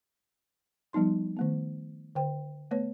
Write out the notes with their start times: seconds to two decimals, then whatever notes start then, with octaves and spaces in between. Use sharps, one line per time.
0.93 F3 G3 B3 D#4 C6
1.37 D#3 A3 B3
2.15 D3 C5 G5
2.71 A3 B3 B4 C#5